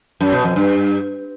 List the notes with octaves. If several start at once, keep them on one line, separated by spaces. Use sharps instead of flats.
F#2
B2
F2
G2